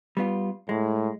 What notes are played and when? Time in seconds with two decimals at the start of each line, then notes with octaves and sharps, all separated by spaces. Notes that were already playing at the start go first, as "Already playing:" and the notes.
0.17 G3 B3 F4
0.69 A2 G#3